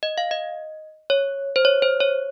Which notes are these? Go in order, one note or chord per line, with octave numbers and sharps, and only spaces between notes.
D#5
F5
D#5
C#5
C5
C#5
C5
C#5